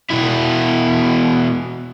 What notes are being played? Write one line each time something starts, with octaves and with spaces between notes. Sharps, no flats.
B2 E4